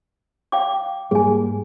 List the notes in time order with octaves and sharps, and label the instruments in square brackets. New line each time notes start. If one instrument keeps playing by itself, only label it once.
[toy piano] F5 G5 D6
[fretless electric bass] G#2 G3 A#3 [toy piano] G#4 G#5